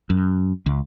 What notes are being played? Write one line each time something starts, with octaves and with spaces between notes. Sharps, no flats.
F#2
C#2